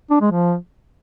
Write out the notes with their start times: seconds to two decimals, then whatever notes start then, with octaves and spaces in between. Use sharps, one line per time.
0.10 D4
0.21 G#3
0.32 F3